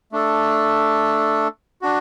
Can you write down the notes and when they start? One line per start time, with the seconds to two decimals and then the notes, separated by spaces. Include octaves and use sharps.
0.12 A3 D4 A4
1.82 D4 F#4